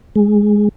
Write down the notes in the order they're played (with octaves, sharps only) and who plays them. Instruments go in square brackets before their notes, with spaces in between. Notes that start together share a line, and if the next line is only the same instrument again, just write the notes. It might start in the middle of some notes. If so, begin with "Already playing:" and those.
[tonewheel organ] G#3